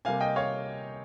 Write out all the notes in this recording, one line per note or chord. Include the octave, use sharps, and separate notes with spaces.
C3 G3 A#3 F5 G#5
D#5 G5
C#5 F5